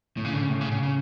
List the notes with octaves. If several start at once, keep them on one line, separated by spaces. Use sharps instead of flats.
A2
C#3
D3
C#3
A2
C#3
C#3
C#3